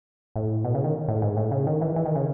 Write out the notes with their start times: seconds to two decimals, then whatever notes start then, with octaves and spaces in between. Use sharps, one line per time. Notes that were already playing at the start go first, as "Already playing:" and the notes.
0.36 A2
0.65 B2
0.75 C#3
0.84 D#3
1.08 A2
1.22 G#2
1.37 A2
1.51 C#3
1.67 D#3
1.81 E3
1.96 E3
2.06 D#3
2.15 C#3